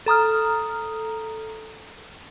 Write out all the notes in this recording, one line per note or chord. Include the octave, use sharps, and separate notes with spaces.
A4 A#5 D#6 F6